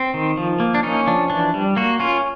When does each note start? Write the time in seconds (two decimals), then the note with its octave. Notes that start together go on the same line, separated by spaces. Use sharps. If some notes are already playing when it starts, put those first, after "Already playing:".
Already playing: C4
0.14 D#3
0.37 F3
0.60 A#3
0.74 D4
0.83 C#4 D#4
1.07 F3 D4
1.30 E3 D4
1.54 G3
1.76 A#3 F#4
2.00 C#4 F4